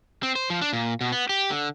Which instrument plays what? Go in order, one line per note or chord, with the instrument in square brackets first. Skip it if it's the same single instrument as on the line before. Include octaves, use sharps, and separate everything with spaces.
[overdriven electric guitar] C4
C5
F3
D4
A#2
B2
B3
G4
D3